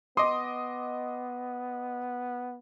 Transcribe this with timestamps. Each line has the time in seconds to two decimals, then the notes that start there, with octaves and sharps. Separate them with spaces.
0.17 B3 D#5 C6 D6 D#6